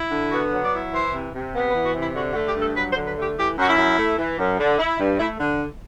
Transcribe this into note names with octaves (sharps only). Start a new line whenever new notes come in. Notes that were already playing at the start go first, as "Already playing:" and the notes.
Already playing: E4
D3
B3 F#4
F#3
D5
E4
E3 C5
C3
C3
B3
B4
E3
F#4
C3
E4
D3 F#4
F#4
A3
G4
G2
A4
F#3 B4
C5
D3
B4
A3 G4
E3 G4
F#2 F#4
E4
F#2
A3
E3
F#2
D3
E4
G2
A3 E4
D3